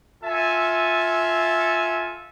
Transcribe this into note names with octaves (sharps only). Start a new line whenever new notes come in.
F4 A4 E5 G#5